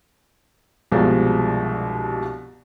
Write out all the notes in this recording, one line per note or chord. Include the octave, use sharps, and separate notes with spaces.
C2 G2 B2 F3 G#3